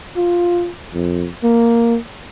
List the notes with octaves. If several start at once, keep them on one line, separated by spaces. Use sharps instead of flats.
F4
F2
A#3